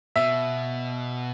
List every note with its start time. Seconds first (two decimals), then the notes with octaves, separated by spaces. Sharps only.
0.16 B2 E5